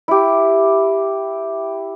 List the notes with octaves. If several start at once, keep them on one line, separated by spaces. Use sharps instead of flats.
E4 G4